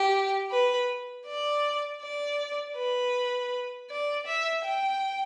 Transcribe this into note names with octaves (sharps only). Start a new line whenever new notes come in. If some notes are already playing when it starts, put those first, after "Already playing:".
Already playing: G4
B4
D5
D5
B4
D5
E5
G5